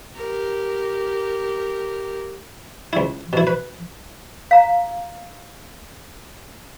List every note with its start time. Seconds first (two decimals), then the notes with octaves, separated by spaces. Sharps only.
0.16 G4 A#4
2.93 C#2 E4
3.33 B2 E4
3.47 B4
4.51 F5 A#5